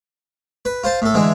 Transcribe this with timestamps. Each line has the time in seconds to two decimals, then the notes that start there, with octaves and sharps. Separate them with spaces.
0.65 B4
0.84 F4 C5 A5
1.02 A2 A4
1.14 D3 E3 G#3